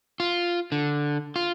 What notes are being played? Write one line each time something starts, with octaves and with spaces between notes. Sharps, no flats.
F4
D3
F4